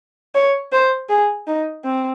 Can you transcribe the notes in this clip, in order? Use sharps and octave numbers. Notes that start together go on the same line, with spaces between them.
C#5
C5
G#4
D#4
C4